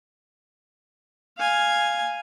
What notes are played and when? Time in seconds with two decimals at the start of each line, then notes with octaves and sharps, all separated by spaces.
1.37 F5 G#5